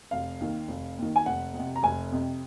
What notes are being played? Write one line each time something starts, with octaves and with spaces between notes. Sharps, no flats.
F1 F5
D#2 D#3
F1
D#2 D#3
G#5
F1 F#5
F2
C3
A#5
F1 G#5
F2 C3